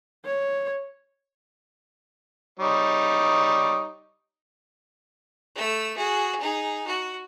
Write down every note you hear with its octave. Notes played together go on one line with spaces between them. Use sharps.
C#5
G3 D#4 C#5
A3 E6
F#4 G#4
D#4 G#4
F#4